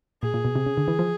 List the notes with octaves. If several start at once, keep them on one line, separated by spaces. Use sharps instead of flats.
A#2 G#4
A#2
B2
C3
C#3
D3
E3
F3